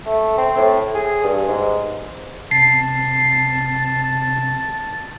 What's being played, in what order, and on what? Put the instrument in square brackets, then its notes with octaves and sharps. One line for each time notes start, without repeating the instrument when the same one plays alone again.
[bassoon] A3
C4
A2
G#4
G2
G#2
[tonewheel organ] C3 [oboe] A5 [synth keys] C7